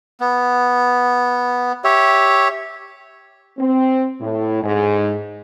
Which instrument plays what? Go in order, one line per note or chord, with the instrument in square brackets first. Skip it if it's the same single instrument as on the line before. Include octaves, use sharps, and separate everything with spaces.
[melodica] B3
G4 C#5 E5
[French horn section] C4
A2
G#2